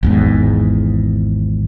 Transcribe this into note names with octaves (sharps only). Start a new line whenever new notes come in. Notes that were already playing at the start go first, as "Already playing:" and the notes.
G#1 E2 G#2